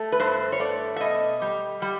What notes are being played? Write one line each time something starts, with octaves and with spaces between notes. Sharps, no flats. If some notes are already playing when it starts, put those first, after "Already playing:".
Already playing: A3
B4
G2 C5
C#5
A3 D5
E5
B2 D#5
G3
G3